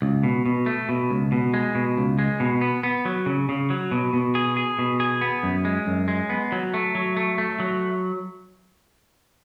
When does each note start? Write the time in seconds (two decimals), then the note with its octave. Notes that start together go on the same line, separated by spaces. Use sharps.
0.02 C#2
0.24 B2
0.46 B2
0.66 A3
0.89 B2
1.10 C#2
1.32 B2
1.54 G#3
1.75 B2
1.97 C#2
2.19 G#3
2.40 B2
2.61 B3
2.83 B3
3.05 F#3
3.26 C#3
3.49 C#3
3.70 F#3
3.91 B2
4.13 B2
4.35 G#4
4.57 G#4
4.79 B2
5.00 G#4
5.21 B3
5.43 F#2
5.65 G#3
5.87 F#2
6.08 G#3
6.29 B3
6.52 F#3
6.74 A3
6.95 F#3
7.17 A3
7.38 A3
7.60 F#3